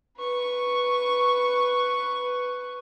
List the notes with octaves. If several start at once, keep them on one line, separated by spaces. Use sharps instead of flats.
B4 C#6